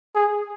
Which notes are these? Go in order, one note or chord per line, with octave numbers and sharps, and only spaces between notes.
G#4